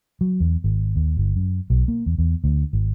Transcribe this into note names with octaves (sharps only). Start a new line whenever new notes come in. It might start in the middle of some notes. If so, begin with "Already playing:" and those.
F#3
E2
G#1
D#2
G1
F#2
B1
A#3
E2
E2
D2
G#1